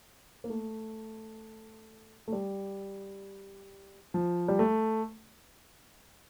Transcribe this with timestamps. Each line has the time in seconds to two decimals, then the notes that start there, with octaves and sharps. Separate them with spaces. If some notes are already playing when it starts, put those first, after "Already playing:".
0.44 A#3
0.50 A3
2.28 A3
2.32 G3
4.14 F3
4.48 G3
4.59 A3